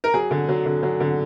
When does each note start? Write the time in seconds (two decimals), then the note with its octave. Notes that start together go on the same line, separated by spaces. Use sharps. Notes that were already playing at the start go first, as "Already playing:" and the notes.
0.04 A#4
0.14 F#3 G#4
0.31 D3
0.49 F#3
0.66 D3
0.83 F#3
1.00 D3